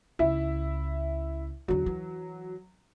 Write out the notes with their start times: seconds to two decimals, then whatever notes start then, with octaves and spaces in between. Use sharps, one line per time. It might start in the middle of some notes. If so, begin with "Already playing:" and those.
0.19 C#2 E4 E5
1.68 E2 D3 F#3
1.86 E3